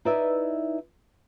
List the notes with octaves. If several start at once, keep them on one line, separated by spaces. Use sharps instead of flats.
D#4 E4 B4 D5 E5